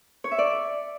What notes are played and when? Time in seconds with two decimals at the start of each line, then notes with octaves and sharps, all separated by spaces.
0.24 C#5
0.31 E5
0.38 D5